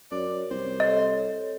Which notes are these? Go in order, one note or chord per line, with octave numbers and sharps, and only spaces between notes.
F#2 A#4 C#5 D5
C2 C5
A4 C#5 D#5